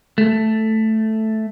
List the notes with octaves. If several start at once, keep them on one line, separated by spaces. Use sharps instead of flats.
A3